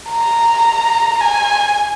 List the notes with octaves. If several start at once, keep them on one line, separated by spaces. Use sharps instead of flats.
A#5
G#5